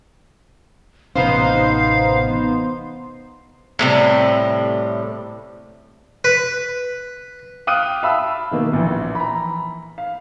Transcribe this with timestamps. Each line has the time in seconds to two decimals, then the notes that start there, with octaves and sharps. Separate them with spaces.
1.16 A1 C3 B3 C#4 D#4 C5 F5
3.79 A2 C3 G3
6.24 B4
7.67 F5 G5 D#6 F6 F#6 D#7
8.03 E5 F5 A5 B5 E6
8.51 B2 D#3 A#3
8.73 A#1 E3
9.15 A#5 B5
9.98 F5